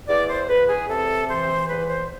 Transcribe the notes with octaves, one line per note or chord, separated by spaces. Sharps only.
E2 D5
C5
E2 B4
G#4
C3 A4
E3 C5
E2 B4
C5